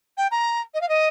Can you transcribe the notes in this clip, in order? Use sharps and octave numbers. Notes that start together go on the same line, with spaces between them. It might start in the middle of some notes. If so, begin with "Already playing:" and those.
G5
A#5
D#5
F5
D#5